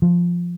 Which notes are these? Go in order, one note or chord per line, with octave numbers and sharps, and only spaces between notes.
F3